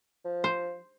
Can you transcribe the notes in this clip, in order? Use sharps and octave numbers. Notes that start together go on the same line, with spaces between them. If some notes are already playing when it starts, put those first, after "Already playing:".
F3
C5